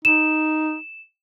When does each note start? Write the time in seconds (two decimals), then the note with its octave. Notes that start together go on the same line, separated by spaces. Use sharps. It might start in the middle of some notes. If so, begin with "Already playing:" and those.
0.05 D#4 E7